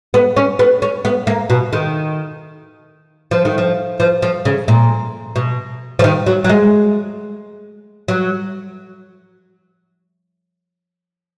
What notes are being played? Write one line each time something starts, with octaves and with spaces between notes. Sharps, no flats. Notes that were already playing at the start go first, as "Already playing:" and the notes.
B3
C#4
B3
C#4
B3
A#3
B2
D#3
F3
D#3
F3
F3
F3
C#3
A#2
B2
F3
D#3
F#3
F#3
G#3
F#3